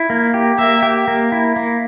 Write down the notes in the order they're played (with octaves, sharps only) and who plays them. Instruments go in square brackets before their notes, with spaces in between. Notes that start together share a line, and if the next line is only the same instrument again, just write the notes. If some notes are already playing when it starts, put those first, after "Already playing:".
Already playing: [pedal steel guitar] E4
A#3
G4
[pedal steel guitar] A#3 [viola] E5
[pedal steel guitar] G4
A#3
E4
A#3